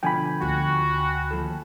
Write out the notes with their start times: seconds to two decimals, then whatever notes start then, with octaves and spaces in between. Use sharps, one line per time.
0.03 B2 D3 F3 G5 G#5 B5
0.41 D2 F#4
1.31 D#2 F3 A4